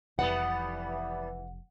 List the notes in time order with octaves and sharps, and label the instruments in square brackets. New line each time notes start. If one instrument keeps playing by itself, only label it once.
[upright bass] F1 C3 [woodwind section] E3 [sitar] G3 B3 [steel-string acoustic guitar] F#5